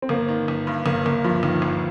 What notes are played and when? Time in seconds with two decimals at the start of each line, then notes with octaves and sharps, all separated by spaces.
0.02 C4
0.09 G1 A#3
0.29 D#3
0.48 G1
0.67 G2
0.86 G1 A#3
1.05 G1 A#3
1.24 G2 F3
1.43 G1 D#3
1.62 G#1